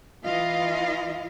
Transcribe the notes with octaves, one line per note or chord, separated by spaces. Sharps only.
E3 E4 F4 D#5 F5